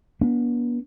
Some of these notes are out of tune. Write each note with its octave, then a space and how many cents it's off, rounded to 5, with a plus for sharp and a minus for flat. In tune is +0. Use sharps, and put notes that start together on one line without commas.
B3 -45 D4 -35